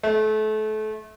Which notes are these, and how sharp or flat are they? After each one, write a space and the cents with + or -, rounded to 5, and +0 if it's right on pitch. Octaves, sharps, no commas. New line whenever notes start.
A3 -30